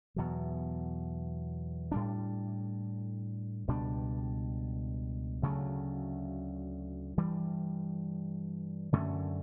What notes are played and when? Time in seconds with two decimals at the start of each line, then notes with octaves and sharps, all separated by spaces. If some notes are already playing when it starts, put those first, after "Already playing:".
0.16 E2 B2 F#3
1.92 A2 G3 D4
3.67 C#2 B2 G3 D4
5.42 D2 C#3 F#3 A3
7.18 G2 E3 G3
8.93 F#2 D3 A3 C#4